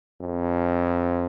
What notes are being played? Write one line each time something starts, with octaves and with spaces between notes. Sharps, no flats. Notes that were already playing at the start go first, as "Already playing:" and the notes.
F2